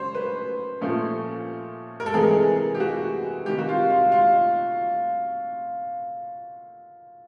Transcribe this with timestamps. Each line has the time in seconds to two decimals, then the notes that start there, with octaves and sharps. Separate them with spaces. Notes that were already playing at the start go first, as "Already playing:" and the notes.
Already playing: C#3 F#3 C5 C#5
0.15 B4
0.81 A#2 F3 A3 C#4
2.00 A#4
2.06 A4
2.14 C3 E3 G#3 G#4
2.75 G4
2.80 F#4
3.45 C3 D#3 G3 G4
3.58 F#4
3.69 F4
3.90 F4
4.12 F4